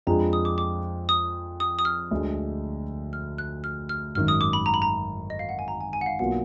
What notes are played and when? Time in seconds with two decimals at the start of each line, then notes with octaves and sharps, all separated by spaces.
0.07 F2 F3 G#3 D4 G#4 A#5
0.19 B5
0.33 D#6
0.45 D6
0.58 D6
1.09 D#6
1.60 D#6
1.79 D#6
1.85 F6
2.11 D2 D3 G#3 D4
3.13 F6
3.38 F#6
3.64 F6
3.89 F6
4.15 G#1 F#2 D#3 F6
4.28 D#6
4.41 D6
4.53 B5
4.66 A#5
4.74 B5
4.82 A#5
5.30 D#5
5.39 F5
5.49 F#5
5.59 G#5
5.68 A#5
5.81 G#5
5.93 G#5
6.01 F#5
6.06 F5
6.19 B1 B2 A#3 F4 F#5